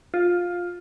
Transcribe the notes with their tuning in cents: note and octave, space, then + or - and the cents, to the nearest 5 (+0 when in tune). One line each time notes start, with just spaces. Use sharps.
F4 +10